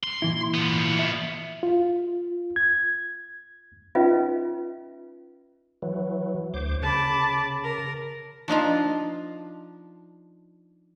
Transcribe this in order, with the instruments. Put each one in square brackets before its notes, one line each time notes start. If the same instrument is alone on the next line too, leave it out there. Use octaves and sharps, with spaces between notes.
[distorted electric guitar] C6
[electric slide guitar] A#2 E3 E4
[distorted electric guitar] F3 B3
[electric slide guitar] E5
[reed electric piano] F4
G#6
[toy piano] C#4 D#4 F4 B4 D#5 E5
[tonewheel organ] E3 F#3
D2 C5 D6
[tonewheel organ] C#3 [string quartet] A5 B5 D6
[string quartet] A#4
[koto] F3 D4 D#4 F4